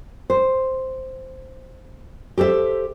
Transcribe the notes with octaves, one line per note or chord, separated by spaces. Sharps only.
C5
G4 A4 C5 E5